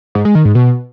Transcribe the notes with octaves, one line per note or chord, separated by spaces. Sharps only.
G#2
G#3
D#3
G#2
B2